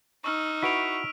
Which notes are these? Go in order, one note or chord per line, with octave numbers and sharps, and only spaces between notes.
D#4 C#6 E6 F6
E4 F#4 B4 B6 D7 F7